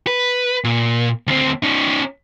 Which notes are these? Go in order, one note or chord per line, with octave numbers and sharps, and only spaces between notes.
B4
A#2
D2 C4
C#4 D#4